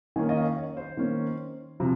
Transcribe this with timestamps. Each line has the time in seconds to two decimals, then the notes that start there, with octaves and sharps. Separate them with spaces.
0.16 D#3 A#3 C#4 G#5
0.29 D#5
0.37 F5
0.57 C#5
0.77 C5
0.97 D#3 A#3 C#4
1.80 C3 F3